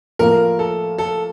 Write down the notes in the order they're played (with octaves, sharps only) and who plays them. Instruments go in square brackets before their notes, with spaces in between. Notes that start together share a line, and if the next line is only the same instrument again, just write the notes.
[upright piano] A2 F3 A#3 F4 [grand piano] A#4
[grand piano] A4
A4